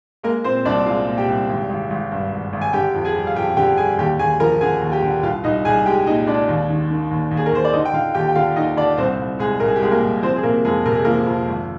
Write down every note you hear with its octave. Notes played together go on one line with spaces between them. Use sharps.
G#3 A#3 A#4
A#2 C4 C5
C2 D4 D5
G#3 F4 F5
A#2
G4 G5
C2
G#1
G#1
G#1
G2
G#1
G#1
G#5
D3 G4 G5
F2
G#4 G#5
G3
F5
F2 G4 G5
D3 G4 G5
G3 G#4 G#5
D#2 G4 G5
D#2 G#4 G#5
F3 A#4 A#5
D3 G#4 G#5
D#2
G4 G5
D3
C2 F4 F5
C2 D#4 D#5
C2 G#4 G#5
G#3 G4 G5
A#2 D#4 D#5
G#3 D4 D5
D#2
D#3
D#3
D#2
D#2
G#4
A#4
D#2 C5
D5
D3 D#4 D#5
G5
D3 F4 F5
D#2 G4 G5
G5
D3 F4 F5
D#2 D#4 D#5
D3 D4 D5
C2 C4 C5
C2
C2 G#3 G#4
C2 A#4
G#4
G4
C2 G#3 G#4
A#3 A#4
C2
F3 C4 C5
G#4
C3 A#3 A#4
F2 G#3 G#4
C3 A#4
G#4
F3 A#3 A#4
F2
G#1